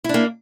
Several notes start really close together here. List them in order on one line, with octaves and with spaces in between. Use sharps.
E4 D4 A#3